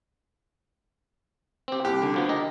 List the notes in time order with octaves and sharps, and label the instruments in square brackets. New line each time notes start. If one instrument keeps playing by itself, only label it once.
[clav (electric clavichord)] C4 G4
[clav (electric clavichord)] C2 [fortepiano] G4
[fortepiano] D3
[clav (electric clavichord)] D2 F3 B3
G4 A#4 D#5